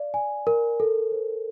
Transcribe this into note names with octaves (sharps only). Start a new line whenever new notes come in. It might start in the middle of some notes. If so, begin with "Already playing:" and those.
Already playing: D5 F5
G#5
A#4
A4
C5